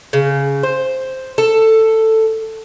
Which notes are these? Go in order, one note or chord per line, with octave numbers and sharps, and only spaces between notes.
C#3
C5
A4